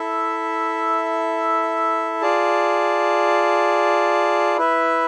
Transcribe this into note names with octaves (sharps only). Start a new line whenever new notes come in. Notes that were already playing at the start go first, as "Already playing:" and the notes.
Already playing: E4 A4 E5
F4 G#4 D5 A5
E4 B4 E5